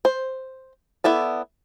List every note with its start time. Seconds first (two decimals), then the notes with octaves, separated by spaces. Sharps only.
0.05 C5
1.04 B3 E4 A4 D5